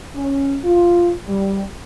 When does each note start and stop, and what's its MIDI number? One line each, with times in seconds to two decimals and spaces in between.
0.16 0.57 61
0.64 1.12 65
1.27 1.63 55